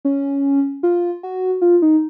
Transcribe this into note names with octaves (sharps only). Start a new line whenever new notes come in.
C#4
F4
F#4
F4
D#4